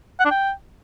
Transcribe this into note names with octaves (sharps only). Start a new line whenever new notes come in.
F#5
D4
G5